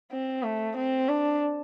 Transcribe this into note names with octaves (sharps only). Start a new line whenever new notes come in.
C4
A3
C4
D4